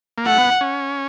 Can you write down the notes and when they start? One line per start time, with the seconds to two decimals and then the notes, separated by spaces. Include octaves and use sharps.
0.18 A#3
0.26 A3 F#5
0.38 B3
0.61 C#4